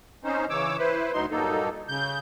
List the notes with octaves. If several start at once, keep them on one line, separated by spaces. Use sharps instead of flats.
C4 C#4 D#4 C5
C#3 E3 C#5 D6 E6
E4 B4 C5
D2 F#3 D#4 C6
G2 A#2 F#3 A#3 D#4 A4
C#3 G6